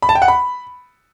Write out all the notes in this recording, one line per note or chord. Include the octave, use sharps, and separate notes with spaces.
B5
A5
G5
F#5
B5